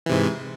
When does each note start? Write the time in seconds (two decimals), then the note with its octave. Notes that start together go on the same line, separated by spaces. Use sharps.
0.06 E3
0.09 C3
0.12 G#2